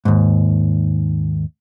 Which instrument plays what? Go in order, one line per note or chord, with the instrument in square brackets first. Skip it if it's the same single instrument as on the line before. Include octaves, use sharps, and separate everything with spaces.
[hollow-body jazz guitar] D#2 G#2